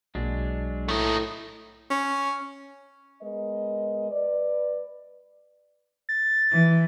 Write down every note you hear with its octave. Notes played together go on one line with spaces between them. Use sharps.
B1 F#3 G#3 A#3 D4
A2 A3 D#4
C#4
G#3 B3 A#4 D#5
B4 D5
A6
E3